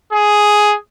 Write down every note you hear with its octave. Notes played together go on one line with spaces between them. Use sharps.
G#4